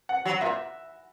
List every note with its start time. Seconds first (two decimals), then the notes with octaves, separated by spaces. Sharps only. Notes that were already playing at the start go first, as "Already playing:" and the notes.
0.09 F#5
0.25 F#3 F#5
0.41 A#2 E5